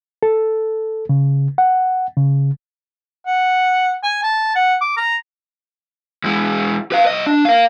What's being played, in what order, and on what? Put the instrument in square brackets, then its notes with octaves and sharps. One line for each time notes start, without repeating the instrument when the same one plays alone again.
[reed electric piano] A4
C#3
F#5
C#3
[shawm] F#5
G#5
A5
F#5
D6
A#5
[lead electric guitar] E2 G#3
B4 F5
C2 D#5
D4
A#4 F5